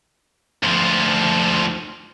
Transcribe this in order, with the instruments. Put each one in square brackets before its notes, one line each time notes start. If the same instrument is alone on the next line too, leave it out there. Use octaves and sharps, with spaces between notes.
[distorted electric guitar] D2 F3